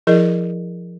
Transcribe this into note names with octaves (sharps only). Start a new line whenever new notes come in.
F3 E4 G#4 A#4 D#5